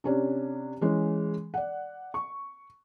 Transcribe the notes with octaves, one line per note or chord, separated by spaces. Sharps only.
C3 C#4 D4
E3 G#3 C#4
D5 F#5
C#6